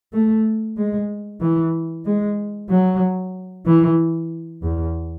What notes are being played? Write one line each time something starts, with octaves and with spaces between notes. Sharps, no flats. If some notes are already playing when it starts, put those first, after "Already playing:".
A3
G#3
E3
G#3
F#3
E3
E2